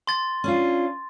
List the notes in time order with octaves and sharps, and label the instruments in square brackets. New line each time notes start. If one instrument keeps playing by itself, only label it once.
[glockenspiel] C6 A6
[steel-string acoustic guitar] C#4 D4 F4